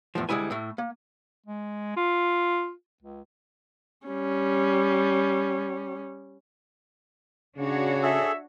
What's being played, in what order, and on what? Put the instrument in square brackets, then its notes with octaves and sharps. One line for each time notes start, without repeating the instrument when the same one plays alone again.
[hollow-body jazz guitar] E2 A2 F3
D2 G3 G#3 E4 G#5
A2 A3
A#3
[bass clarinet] G#3
F4
C#2
[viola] G3 C#4
[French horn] C#3 [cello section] D4 F#4 C#5
[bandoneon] G#4 A4 [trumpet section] E5